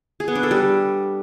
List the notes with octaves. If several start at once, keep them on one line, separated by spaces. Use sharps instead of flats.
G#4
B3
D4
A4
G3